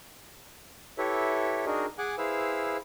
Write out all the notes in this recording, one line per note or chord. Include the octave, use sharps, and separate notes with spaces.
E4 G4 A4 B4 C#5 E5
D4 D#4 F#4 G#4 A#4 D#5
G#4 F#5 G#5 D6 F#6
E4 G#4 B4 C5 F5 E6